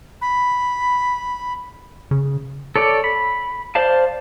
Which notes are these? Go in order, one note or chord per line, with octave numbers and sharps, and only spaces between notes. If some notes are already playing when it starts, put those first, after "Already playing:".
B5
C#3
A4 C#5 D5
B5
C5 D5 F5 A5